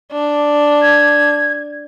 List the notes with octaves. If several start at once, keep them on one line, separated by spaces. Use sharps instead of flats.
D4
G#6